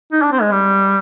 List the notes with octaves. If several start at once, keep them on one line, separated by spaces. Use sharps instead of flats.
D#4
D4
C4
G#3
G3